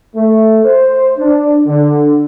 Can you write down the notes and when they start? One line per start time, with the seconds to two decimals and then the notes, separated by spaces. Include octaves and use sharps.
0.15 A3
0.63 C5
1.18 D4
1.67 D3